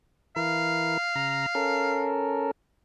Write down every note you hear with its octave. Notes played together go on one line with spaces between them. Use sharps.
E3 E4 A#4 F5
C#3 A#5
C#4 A4 A#4